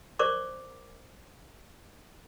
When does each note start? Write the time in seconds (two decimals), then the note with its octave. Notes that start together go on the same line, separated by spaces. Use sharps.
0.19 A#4 C5 D5 C#6 D6